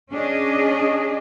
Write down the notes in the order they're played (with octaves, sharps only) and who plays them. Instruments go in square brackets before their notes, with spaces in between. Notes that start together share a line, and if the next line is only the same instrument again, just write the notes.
[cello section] C#4 D4 G#4 D#5